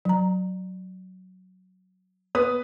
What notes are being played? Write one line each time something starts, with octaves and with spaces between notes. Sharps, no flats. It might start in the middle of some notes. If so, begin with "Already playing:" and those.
F#3 A#5
B3 B4 D#6